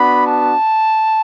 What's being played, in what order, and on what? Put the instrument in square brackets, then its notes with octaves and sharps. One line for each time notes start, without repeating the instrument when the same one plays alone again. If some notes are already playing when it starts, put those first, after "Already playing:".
Already playing: [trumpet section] B3 D4 F#4 B5
A5